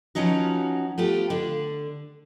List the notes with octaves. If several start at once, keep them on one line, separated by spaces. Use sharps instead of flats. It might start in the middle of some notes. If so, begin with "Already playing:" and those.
E3 F3 C#4 D#4 F#4
A3 B3 F4 G4
D3 D4